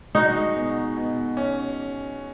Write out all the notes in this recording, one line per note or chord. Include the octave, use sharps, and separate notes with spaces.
G#3 D#4 F#4
B2
B2
C#4